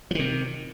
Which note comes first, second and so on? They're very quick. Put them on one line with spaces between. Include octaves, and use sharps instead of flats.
F3 D#3 C3